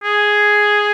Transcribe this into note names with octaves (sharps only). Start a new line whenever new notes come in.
G#4